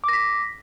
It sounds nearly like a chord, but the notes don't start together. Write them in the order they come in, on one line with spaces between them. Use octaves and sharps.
D6 A#6 B6